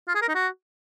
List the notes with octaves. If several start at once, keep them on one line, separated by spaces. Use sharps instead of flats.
F4
G#4
A#4
D#4
F#4